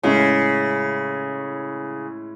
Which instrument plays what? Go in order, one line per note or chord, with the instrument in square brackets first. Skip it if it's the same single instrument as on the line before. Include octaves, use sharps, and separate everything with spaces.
[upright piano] A2 G#3 C#4 [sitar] C#3